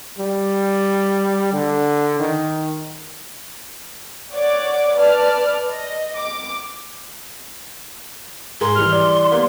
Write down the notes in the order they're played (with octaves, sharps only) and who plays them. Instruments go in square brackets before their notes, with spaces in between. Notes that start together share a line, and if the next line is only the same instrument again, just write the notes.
[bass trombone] G3
D3
D#3
[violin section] C#5 D5 F#5 D6
B4 D5 A5 F6
D#5
D6
[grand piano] G#2 G#4 A#4 [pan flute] C6
[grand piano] E3 G3 [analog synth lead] F6
[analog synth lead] D5
[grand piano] G3 A#3 B3